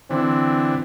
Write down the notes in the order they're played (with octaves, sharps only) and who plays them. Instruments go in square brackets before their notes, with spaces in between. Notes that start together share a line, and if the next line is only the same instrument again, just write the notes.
[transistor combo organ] D3 E3 [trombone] C4